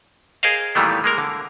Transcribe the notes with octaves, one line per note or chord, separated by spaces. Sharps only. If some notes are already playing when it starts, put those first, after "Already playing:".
G#4 A#4 C5 D#5 F5
A#2 D#3 E3 G3 A3 B3
G#3 A#3 A#4
D3